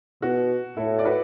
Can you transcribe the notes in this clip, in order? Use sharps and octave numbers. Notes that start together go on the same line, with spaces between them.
B2 F#4
A2 E4 A4
D5
F#4 B4